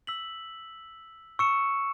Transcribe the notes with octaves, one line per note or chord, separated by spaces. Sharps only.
E6 B6 F#7
C#6 E6 C#7 E7